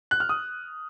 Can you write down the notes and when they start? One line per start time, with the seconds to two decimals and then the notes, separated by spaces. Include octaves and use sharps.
0.11 F#6
0.20 F6
0.29 D#6